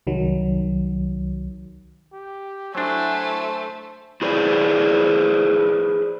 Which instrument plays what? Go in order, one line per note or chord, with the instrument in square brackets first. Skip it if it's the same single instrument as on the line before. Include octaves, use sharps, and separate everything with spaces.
[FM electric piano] C2 D#3 F#3
[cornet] G4
[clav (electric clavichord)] F#3 D4 [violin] A3 [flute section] E4 F#4 G#5 [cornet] C5
[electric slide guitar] E4 G#4 B4 C5 D5